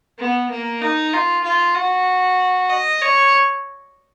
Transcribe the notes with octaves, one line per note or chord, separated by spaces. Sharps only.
B3
A#3
D#4
F4
F4
F#4
D#5
C#5